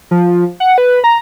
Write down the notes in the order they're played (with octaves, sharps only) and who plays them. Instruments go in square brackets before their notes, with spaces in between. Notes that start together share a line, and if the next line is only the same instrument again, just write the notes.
[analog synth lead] F3
F#5
B4
A#5